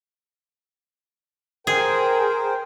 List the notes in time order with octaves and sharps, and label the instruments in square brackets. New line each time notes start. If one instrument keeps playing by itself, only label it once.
[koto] G#4 [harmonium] A#4 C5 G5